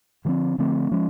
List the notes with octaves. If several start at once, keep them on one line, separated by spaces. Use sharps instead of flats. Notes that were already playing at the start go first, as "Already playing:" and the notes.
D3 F3 A3 C4
D3 F3 A3 C4
F3 G#3 C#4